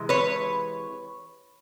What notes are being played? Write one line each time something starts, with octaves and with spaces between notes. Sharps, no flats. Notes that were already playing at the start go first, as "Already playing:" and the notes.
Already playing: C3 E3 G#3
B4 C#5